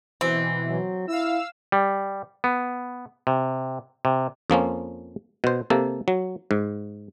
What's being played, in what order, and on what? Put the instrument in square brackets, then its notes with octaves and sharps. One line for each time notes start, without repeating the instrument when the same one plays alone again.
[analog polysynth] B2 E3 [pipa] C4
[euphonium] F#3
[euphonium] E4 [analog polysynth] F5 E6
[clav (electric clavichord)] G3
B3
C3
C3
F2 F3 A#3 C#4
B2 C5
C3 A#3 A4
F#3
G#2